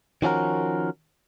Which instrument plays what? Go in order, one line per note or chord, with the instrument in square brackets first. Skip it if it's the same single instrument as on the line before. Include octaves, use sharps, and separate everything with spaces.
[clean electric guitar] D#3 F3 C#4 F#4 A#4